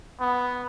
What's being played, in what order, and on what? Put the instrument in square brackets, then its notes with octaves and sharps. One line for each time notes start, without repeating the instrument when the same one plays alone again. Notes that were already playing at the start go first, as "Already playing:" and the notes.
[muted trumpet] B3